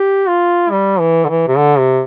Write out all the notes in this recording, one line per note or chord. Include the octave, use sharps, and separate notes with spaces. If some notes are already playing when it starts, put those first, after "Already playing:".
Already playing: G4
F4
G3
E3
D3
E3
C3
D3
C3